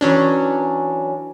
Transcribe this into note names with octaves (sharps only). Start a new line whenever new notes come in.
E3 F#3 C#4 D4